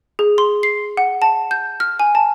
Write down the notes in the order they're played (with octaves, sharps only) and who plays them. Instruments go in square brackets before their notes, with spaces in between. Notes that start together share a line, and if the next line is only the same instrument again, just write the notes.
[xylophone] G#4
C6
C7
F#5
A5
G6
F6
G#5
A5